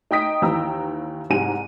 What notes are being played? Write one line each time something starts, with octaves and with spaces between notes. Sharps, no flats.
D#4 G5 D#6 B6 D7
D#2 E3 G5 A#5 E6
C2 G#2 G4 G#5 D#7